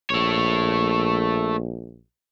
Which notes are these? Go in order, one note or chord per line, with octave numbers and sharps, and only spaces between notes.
A#1 A3 C#5